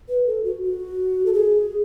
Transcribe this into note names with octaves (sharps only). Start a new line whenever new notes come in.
B4
A4
F#4
F#4
A4
G#4